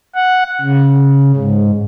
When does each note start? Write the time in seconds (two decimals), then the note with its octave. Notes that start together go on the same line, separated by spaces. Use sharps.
0.15 F#5
0.61 C#3
1.37 G#2